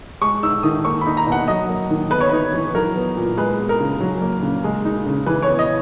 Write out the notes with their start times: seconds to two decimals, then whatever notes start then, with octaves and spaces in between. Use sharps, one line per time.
0.21 G#3 C#6
0.43 D#4 E6
0.63 D#3 D#6
0.85 A#3 C#6
1.01 B5
1.06 D#4
1.17 A#5
1.27 B2 F#5
1.48 F#3 D#5
1.69 A#3
1.90 D#3
2.11 B3 B4
2.20 C#5
2.29 D#4 B4
2.53 E3
2.74 F#3 A#4
2.95 B3
3.17 A#2
3.37 G#3 B4
3.59 B3
3.69 A#4
3.80 C#3
4.01 F#3
4.22 A#3
4.43 C#3
4.64 G#3
4.85 D#4
5.06 C#3
5.26 E3 B4
5.42 C#5
5.48 B3
5.59 D#5